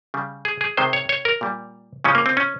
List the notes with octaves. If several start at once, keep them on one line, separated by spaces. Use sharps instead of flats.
C#3 G3
G#4
G#4
C3 D#3 G#3 C5
C#5
C#5
A#4
A#2 G3
C#3 F3 G#3 C#4
A#3
C4
C#4